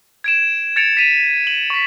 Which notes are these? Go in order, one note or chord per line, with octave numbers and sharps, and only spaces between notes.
G#6 D7 E7
G#6 A6 C#7 D7 F7
B6 D#7 F7
F#7
C#6 B6